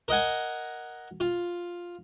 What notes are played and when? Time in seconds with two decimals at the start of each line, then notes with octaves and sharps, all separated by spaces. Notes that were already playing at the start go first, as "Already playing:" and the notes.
0.08 A#4 D#5 F#5 G#5
1.20 F4